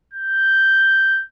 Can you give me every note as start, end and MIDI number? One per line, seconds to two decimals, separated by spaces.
0.14 1.22 91